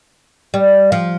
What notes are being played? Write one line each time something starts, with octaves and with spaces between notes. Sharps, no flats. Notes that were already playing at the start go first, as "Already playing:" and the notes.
G3
F3